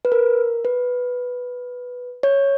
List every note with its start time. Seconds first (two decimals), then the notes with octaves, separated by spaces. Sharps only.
0.05 B4
0.12 A#4
0.65 B4
2.23 C#5